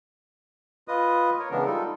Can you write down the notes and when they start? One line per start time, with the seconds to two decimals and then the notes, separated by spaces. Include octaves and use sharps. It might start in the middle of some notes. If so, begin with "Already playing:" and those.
0.88 F4 B4 D#5 D#6
1.39 A#4 C#5
1.51 C#3 E3 G#3 B3 D4 A#4
1.65 G3 D#4 F4 A4